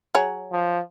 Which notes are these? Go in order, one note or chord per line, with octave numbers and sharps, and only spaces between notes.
F#3 G#4 C#5
F3